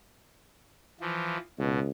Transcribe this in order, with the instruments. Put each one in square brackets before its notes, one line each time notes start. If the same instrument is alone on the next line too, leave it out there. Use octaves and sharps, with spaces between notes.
[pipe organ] E3 F3
[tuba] C#2 [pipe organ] B2